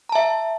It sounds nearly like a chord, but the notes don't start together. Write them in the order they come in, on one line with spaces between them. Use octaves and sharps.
A#5 A5 E5